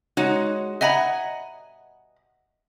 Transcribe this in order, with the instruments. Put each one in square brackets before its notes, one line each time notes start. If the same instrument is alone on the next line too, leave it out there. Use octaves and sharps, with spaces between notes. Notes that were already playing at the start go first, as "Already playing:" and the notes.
[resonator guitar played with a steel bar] G#3 D#4 F#4 [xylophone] C#5
[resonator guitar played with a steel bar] D#5 F#5 G#5 [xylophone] E5 A#5 B5